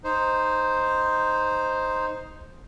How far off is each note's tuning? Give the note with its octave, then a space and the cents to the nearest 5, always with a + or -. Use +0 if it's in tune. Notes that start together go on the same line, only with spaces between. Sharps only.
D#4 +0 C5 +0